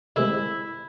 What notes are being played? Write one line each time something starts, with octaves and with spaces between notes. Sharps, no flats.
C3 D#3 G#3 E4